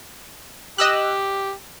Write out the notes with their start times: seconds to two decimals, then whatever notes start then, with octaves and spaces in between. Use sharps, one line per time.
0.78 G4 D#5 E6 F#6